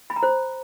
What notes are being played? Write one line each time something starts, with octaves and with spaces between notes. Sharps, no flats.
B5
A#5
C5